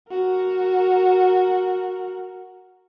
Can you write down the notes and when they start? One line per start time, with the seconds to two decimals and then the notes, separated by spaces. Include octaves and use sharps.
0.11 F#4 A#4